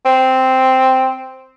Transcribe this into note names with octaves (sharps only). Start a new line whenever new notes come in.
C4